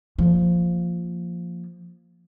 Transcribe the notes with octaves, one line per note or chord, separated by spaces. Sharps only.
F3 A#3